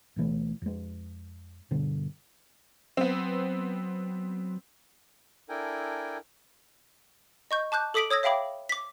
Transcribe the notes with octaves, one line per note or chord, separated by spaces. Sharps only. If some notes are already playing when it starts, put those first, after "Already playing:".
D2 B2 E3 A3
F2 G#3
G2 B2 D3
F#3 B3 C4
D4 E4 A4 A#4 G5 G#5
D#5 C#6 G6
A5 D6 F#6 G6
A4 D6 D#6 B6 D7 F#7
C#5 D#6 E6 G#6 A#6
C#5 E5 F5 G5 B5 D6
D6 B6